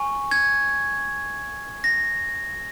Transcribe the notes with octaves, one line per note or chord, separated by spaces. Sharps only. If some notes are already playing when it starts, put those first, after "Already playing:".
Already playing: G#5 C#6
G#6
A#6